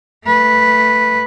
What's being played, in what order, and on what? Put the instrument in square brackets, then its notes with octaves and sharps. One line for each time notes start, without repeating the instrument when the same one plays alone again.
[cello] A3 B4